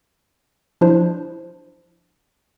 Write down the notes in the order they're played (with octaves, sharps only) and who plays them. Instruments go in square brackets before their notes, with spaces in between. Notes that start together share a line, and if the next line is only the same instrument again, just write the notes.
[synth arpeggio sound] F3 D4 E4 C5